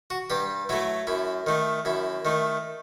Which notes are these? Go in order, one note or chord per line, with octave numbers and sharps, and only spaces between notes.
F#4
G2 G4
F#3 A3 E4
F#2 E4
D#3 A3
F#2 E4
D#3 A3